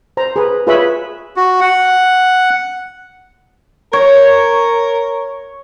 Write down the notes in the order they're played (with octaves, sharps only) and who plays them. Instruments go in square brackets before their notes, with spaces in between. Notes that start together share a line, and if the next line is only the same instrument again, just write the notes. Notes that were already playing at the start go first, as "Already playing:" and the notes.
[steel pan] C5 A#5
G#4 B4
F4 G#4 B4 C#5 E5 B5
[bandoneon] F#4
F#5
[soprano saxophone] A#4 [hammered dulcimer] C#5